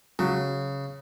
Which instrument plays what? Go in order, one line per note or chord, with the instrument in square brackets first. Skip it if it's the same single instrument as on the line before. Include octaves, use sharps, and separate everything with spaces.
[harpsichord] C#3 [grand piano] F#3